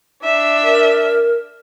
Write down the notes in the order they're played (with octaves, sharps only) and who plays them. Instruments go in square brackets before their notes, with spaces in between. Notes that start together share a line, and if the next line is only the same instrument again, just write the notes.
[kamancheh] D4 E5
[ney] A#4